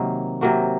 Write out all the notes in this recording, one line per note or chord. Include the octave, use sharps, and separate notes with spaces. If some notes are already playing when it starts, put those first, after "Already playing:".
Already playing: C3 D#3 F#3 A#3
C3 F#3 A#3 F#4